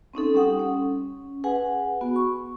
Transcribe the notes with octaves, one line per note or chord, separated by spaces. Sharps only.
C4 C#4 D#4 A4
G3 C#4 G4 F#5 D#6
C#4
G#4 B4 F#5 G#5
B3 F#4
C#6